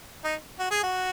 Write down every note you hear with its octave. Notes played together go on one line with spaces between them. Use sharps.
D#4
F#4
G#4
F#4